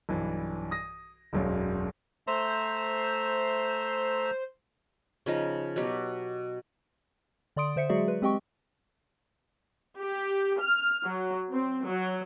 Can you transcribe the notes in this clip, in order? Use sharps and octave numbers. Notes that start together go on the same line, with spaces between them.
B1 G2 E3
D#6 A#6
E1 B1 F#2
A3 C5 E5 A#5
C#3 F3 D#4
B2 F#3 G4
D3 D5 C6 D#6 D7
D3 C5 E5 C#7
F#3 G#3 F#4 G#4 D5 E5
B4
G#3 C4 G4 D#5 G5 C#6
G4
F6
F#3
C4
F#3